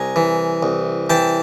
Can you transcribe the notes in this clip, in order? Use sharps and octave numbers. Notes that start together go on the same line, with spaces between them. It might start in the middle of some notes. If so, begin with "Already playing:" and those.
Already playing: C2 G#5 A#5
E3
C2
E3 G5 A5